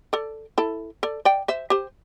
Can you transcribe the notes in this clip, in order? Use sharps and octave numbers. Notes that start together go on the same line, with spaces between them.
A4 D5
E4 A4
A4 D5
D5 G5
C5 E5
G4 C5